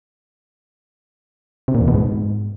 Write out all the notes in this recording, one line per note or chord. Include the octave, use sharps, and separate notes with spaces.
C3
A#2
E2
B2
G#2